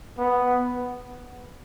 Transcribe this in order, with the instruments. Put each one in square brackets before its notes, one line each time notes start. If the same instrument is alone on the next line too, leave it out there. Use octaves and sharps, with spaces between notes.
[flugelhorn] B3